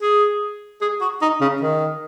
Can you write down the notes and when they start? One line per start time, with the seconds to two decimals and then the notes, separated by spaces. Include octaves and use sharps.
0.02 G#4
0.81 G#4
1.01 F#4
1.22 D#4
1.41 C#3
1.61 D#3